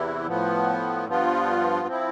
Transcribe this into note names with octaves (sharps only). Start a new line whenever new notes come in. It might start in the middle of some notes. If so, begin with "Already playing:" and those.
Already playing: E2 C3 E3 E4
A2 F3 B3
G2 F3 B3 F4
F3 C4 E4